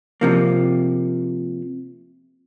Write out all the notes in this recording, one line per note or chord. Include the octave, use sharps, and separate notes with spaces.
C3 F3 A#3